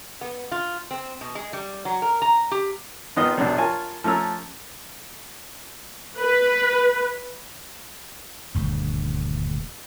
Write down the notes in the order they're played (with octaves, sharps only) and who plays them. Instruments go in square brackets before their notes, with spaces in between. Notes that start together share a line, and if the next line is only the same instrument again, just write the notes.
[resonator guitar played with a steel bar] B3
F4
C4
B2
G#3
G3
F#3
A#4
A#5
G4
[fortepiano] G#1 D#3 B3 F4 D#5 F5
A#1 F#2 B2 F#3 D4
F4 A#4 C#5 G#5 A5
F3 A3 C#4 A#5 E6
[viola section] B4
[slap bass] D#1 D2 G2